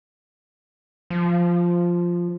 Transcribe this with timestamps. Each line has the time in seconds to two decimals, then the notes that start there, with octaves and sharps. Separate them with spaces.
1.10 F3